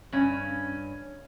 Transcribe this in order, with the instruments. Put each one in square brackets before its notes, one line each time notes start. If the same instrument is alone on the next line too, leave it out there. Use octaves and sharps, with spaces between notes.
[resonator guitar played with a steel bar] G2 C#4